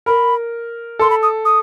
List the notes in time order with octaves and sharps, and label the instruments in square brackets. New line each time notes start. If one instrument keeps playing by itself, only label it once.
[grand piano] A#4 [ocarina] B5
[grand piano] A4 [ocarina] C6
[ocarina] B5
D#6
D#6